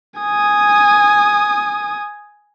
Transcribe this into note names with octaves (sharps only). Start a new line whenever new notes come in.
G#5 D#6